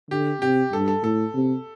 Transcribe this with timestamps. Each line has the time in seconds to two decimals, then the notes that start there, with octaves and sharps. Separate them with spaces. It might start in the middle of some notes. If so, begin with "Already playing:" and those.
0.11 D3 G4
0.42 C3 G4
0.73 G2 A4
0.88 A4
1.03 A2 A4
1.35 C3